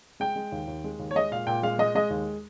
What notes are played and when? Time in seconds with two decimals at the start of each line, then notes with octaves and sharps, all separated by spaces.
0.20 G#3 G5
0.36 G#3
0.52 D#2
0.67 D#2
0.84 G#3
0.99 D#2
1.11 C#5
1.15 G#3 D#5
1.31 A#2 F5
1.47 A#2 G5
1.63 G#3 F5
1.79 G#3 D#5
1.95 G#3 D#5
2.10 D#2